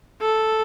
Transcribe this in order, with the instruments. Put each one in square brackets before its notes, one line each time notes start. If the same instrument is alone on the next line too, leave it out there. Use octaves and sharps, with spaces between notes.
[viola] A4